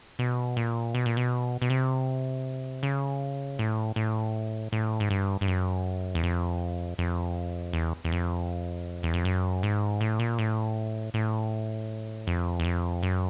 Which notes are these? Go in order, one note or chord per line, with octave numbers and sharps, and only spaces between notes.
B2
A#2
B2
A#2
B2
B2
C3
C#3
A2
A2
A2
G#2
G2
G2
F#2
E2
F2
F2
E2
E2
F2
E2
F2
F#2
G#2
A2
A#2
A2
A2
F2
E2
F2
F#2